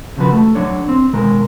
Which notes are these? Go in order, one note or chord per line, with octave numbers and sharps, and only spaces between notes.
D#2 C#3 F3 F#3 F#4 B4
A3
F#3 D4 C#5
C4
B2 D#3 G#3 A#4